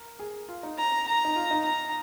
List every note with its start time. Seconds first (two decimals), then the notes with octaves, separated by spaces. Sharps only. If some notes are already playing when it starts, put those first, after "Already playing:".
Already playing: A#4
0.19 G#4
0.49 F4
0.63 D#4
0.78 A#5
1.08 A#5
1.25 D#4
1.36 F4
1.51 D#4
1.65 A#5